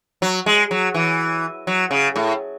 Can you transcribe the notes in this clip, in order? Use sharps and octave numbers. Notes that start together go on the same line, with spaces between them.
F#3
G#3
F#3
E3
F#3
C#3
A2